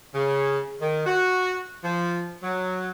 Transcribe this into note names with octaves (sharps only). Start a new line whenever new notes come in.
C#3
D#3
F#4
F3
F#3